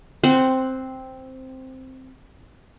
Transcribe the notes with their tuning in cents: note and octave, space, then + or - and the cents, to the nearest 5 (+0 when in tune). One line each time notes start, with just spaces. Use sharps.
C4 +0 C5 -20 F#5 +5